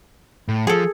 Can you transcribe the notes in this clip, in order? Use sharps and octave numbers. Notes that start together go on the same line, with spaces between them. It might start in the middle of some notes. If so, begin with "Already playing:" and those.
A2
F3 G#4 A4